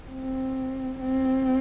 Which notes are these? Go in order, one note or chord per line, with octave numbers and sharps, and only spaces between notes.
C4
C4